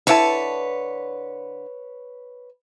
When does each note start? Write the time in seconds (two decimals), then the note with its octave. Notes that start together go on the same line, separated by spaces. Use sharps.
0.07 D3 E4 B4 C#5 A5